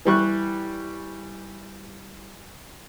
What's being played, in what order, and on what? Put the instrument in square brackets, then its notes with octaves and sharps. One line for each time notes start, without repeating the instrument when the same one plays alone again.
[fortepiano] E3 G3 C#6 F#6